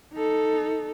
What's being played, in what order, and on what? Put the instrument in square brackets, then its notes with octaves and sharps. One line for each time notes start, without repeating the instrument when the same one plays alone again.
[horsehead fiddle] D#4 A4